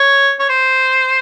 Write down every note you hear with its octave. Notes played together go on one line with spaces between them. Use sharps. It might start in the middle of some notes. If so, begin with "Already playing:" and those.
Already playing: C#5
C#5
C5